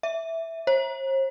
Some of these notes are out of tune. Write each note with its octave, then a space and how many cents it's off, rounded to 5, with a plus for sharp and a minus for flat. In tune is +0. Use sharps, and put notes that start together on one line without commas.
E5 -5
C5 +45